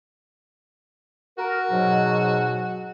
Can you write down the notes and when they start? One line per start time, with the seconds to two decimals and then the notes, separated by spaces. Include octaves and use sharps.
1.38 F#4 A#4
1.71 G#2 B2 F#3